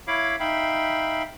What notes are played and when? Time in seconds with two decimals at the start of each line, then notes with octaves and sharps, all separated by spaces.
0.08 E4 C#5 F5 B5 D6
0.40 D#4 E5 F5 G5 B5